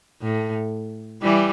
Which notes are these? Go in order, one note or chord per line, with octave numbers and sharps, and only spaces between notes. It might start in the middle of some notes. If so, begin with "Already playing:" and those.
A2
E3 G3